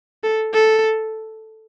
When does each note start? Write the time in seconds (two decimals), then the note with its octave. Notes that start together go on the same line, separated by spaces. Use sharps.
0.23 A4
0.54 A4